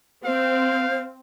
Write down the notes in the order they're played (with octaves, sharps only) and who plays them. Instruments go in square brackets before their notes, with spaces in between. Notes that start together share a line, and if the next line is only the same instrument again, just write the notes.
[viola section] C4 [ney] C5 [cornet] F5